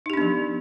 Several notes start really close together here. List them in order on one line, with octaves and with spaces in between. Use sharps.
D#4 G4 D4 B3 F3